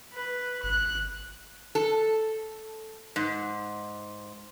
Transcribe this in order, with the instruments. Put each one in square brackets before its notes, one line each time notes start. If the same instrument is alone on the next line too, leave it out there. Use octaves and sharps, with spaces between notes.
[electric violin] B4
[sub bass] G#1 [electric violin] F#6
[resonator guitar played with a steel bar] A4
G#2